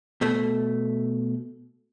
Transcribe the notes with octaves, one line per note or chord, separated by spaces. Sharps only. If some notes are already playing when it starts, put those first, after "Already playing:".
B2 A3